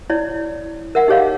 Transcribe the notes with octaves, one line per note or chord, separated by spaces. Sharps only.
E4 C#5 D5
A#4 E5 F#5
D#4 G4 G#4 C#5 D#5 F5